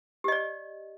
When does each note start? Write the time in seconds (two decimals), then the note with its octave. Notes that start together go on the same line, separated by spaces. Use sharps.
0.24 G4
0.28 D#5
0.32 D5